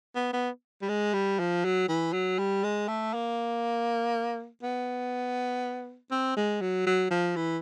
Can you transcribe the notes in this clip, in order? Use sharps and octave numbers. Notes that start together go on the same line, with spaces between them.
B3
B3
G3
G#3
G3
F3
F#3
E3
F#3
G3
G#3
A3
A#3
B3
C4
G#3
F#3
F#3
F3
E3